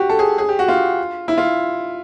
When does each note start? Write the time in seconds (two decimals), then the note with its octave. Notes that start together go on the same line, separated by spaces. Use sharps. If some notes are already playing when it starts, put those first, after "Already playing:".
Already playing: F#4 G4
0.10 A4
0.19 G#4
0.38 G#4
0.49 G4
0.59 F#4
0.68 F4
1.28 E4
1.38 F4